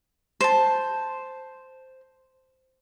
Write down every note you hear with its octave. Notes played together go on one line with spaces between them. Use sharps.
C5 A5